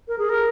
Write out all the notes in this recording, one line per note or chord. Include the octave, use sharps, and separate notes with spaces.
A#4
G#4
A#4